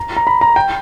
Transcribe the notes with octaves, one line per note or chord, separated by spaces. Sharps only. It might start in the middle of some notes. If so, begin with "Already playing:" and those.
Already playing: A#5
A#5
B5
A#5
G5